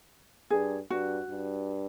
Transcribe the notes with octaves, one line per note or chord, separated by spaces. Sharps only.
G2 G#4
G2 F#4
G2